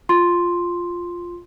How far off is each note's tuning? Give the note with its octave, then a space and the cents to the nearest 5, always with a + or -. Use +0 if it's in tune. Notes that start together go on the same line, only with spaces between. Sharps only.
F4 +0 C6 +0